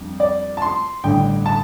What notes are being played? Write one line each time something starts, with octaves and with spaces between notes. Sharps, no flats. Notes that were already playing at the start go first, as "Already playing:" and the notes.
Already playing: F2 G3 D4
D5
A5
C6
A1 G2 D3 G5
A5